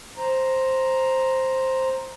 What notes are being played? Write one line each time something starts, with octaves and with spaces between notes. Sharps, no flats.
C5 A#5